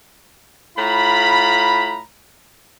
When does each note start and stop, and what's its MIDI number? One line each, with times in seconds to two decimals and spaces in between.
0.77 2.00 45
0.77 2.00 65
0.77 2.00 82
0.77 2.00 83